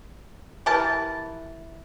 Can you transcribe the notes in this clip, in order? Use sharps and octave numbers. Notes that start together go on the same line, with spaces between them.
E3 G4 A#4 A5